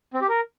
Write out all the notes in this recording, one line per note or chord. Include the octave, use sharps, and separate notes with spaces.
C4
G4
A#4